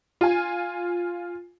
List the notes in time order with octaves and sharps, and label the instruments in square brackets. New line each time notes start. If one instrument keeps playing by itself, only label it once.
[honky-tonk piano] F4 G#5